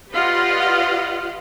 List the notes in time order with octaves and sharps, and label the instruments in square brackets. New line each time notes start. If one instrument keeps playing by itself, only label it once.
[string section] F4 G4 B4 D5 D#5 F#5